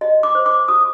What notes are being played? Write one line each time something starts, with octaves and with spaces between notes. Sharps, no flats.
F#4 D#5
D6
C5
D6
F#4 D#6